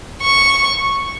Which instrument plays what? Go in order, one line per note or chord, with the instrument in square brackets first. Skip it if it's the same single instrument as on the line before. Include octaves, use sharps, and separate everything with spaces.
[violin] C#6